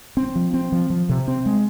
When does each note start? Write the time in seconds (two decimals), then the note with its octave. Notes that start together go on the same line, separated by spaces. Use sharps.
0.17 C4
0.36 F3
0.54 C4
0.72 F3
0.90 F3
1.09 C3
1.28 C4
1.46 G#3